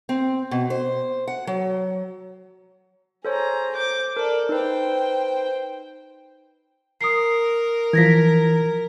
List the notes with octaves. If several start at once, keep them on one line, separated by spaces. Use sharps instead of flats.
C4
B2
C5
F#5
F#3
G#4 A4 C5 C#5 A#5
C5 D6 G6
A4 A#4 D5
D#4 B4 C5 G5
A#4 D#6 C7
E3 F3 G#6 A#6 B6